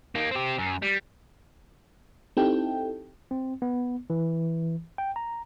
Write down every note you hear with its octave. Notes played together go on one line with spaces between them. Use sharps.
A#3 D#4
C4 G4
F#2
G3
C4 D#4 E4 G4 A4 G5
C4
B3
E3
G5
A#5